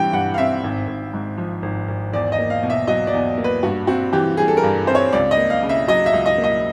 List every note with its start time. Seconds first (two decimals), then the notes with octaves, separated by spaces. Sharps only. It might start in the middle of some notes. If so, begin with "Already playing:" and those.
Already playing: G2 E3 G3 C4 G5
0.13 G2 F#5
0.34 F5
0.38 C4 E5
0.64 G#1
0.88 G#1
1.14 G#2
1.38 F3
1.62 G#1
1.88 G#1
2.13 E2 D5
2.32 D#5
2.38 A#3
2.50 F5
2.63 B2
2.70 E5
2.87 F#3 D#5
3.07 D5
3.13 E2
3.38 A#3
3.44 B4
3.63 G2 F#4
3.87 C4 F#4
4.12 E3 G4
4.37 G3 G#4
4.48 A4
4.57 A#4
4.63 G2
4.87 C4 C5
4.95 C#5
5.12 C#2 D5
5.31 D#5
5.37 A#3
5.50 F5
5.63 C#3
5.69 E5
5.88 F#3 D#5
6.06 E5
6.13 C#2
6.26 D#5
6.38 A#3
6.44 D#5